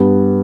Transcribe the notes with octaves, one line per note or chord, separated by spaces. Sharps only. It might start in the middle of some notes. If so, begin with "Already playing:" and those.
Already playing: G2 G3 B3